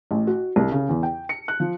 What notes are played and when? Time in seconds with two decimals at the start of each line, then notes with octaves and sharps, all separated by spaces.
0.11 A1
0.27 F#4
0.56 C2
0.72 C#3
0.89 E2
1.03 G5
1.29 C#7
1.48 F#6
1.60 F3